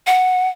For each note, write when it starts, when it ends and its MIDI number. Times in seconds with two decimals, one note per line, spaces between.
0.07 0.48 78